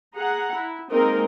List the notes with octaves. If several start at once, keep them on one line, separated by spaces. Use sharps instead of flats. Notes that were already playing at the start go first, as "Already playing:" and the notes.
G#4 F#5 A#5
E4
G#3 A#3 C4 D#4 A#4 D#5